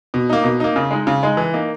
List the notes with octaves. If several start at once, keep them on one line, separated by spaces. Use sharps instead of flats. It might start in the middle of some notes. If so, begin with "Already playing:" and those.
B2
A#3 D#4
B2
A#3 D#4
C#3
G#3 D#4
C#3
G#3 D#4
E3
A#3 D#4